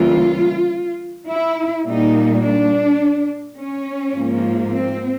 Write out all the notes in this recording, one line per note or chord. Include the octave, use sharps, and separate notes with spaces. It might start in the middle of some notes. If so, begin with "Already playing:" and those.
Already playing: D2 C#3 E3 G3 A#3 F4
E4
A#2 G3 A#3 D#4
D4
C#4
G#2 F3 A#3
C4